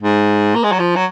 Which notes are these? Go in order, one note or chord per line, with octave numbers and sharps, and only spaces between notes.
G#2
A#3
G#3
F#3
F3
F#3